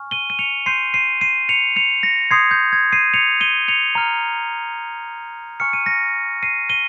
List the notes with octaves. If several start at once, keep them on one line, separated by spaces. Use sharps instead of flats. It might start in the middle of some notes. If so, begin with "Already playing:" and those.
Already playing: G#5 C#6 F6
D#7 G7
D#7
C#7 F7
C6 G6 C7 D#7
C7 D#7
C7 D#7
C#7 F7
C#7 F7
A#6 C#7
C6 D#6 G6 G#6 C7
G6
G#6
C7 D#7
C#7 F7
D#7 G7
C#7 F7
A#5 F6
G#5 C#6 F6 C#7
D#7
A#6 C#7
C7 D#7
D#7 G7